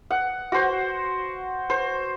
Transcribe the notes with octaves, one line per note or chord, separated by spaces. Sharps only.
F#5
F#4 C5
C5